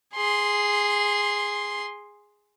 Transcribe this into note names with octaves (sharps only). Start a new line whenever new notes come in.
G#4 C6